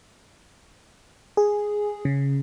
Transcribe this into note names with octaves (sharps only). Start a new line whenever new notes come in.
G#4
C#3